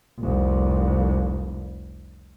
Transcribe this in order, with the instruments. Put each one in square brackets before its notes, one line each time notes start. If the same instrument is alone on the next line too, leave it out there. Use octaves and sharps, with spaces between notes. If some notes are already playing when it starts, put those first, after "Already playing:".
[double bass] F1 C2